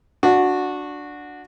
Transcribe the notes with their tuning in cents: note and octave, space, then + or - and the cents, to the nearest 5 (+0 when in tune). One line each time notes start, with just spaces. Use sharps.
D4 +0 F#4 -15